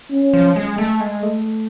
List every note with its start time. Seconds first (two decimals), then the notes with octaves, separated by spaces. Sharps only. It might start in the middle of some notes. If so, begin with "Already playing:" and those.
0.12 C#4
0.33 F3
0.56 G#3
0.78 A3
1.00 G#3
1.23 A3